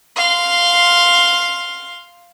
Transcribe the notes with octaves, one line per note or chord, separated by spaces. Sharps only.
F5 C6